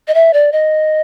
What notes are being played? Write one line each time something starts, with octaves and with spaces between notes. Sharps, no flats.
D#5
E5
D5
D#5